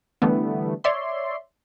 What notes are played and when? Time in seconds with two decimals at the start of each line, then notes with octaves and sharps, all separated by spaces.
0.22 D3 E3 G3 A3 B3
0.84 C#5 D5 E5 C6